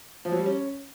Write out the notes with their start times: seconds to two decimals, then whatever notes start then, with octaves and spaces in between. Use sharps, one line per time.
0.25 F3
0.32 F#3
0.39 G3
0.46 C#4